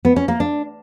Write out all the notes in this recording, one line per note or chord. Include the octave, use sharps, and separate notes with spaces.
B3
C#4
A#3
D4